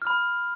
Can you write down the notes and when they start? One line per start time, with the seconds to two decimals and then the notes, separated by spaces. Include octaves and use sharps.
0.02 F6
0.07 B5